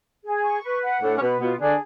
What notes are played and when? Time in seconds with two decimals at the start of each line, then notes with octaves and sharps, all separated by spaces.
0.24 G#4
0.43 C#6
0.63 B4
0.83 F#5
1.01 A2 A3 D4
1.16 C#4
1.21 B2 B3 B4
1.40 B2 B3 F4
1.60 D3 D4 G#4